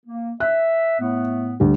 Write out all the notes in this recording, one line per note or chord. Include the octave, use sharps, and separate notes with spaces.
A#3
E5 F#6
A2 A3 B3
D2 G3